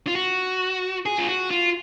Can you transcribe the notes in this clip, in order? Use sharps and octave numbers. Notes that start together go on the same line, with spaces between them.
F4
F#4
G#4
F4
F#4
F4